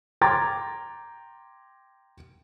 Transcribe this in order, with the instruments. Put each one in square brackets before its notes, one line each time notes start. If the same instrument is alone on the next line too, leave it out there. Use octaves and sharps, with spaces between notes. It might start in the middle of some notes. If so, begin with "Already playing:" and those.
[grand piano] G5 A#5 C6 D6 G#6 A6